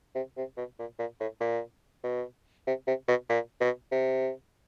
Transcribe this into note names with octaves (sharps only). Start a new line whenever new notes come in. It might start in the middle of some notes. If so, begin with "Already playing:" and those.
C3
C3
B2
A#2
A#2
A2
A#2
B2
C3
C3
B2
A#2
B2
C3